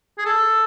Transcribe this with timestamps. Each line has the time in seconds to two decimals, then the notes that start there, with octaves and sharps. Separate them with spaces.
0.18 G#4
0.25 A4